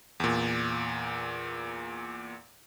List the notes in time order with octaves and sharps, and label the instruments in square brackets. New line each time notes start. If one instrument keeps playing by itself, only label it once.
[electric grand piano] E2 A#2